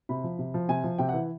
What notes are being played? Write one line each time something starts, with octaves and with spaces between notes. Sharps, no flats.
C3 B5
F3
C3
F3
C3 G#5
F3
C3 G5
F#5
E3